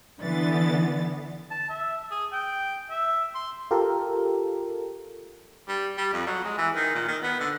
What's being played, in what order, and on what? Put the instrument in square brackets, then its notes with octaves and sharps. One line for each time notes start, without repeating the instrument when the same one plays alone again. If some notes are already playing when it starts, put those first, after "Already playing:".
[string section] D3 E3 B3 A6
[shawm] A5
E5
G#4
G5
E5
C6
[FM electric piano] F4 G4 A4 A#4
[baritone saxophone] G3
G3
F2
F#3
G#3
E3
D#3
A#2
D#3
B3
D3